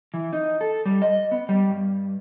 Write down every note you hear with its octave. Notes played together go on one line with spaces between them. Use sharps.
E3
D#4
A4
G3
D#5
B3
G3
G2